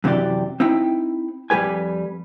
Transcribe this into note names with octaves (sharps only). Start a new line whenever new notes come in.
F#2 C3 E3 G4 D5
C4 D#4 E4 G5
F2 G3 G4 B4 G#5